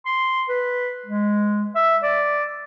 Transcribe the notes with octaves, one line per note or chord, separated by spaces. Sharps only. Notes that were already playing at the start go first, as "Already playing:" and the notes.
C6
B4
G#3
E5
D5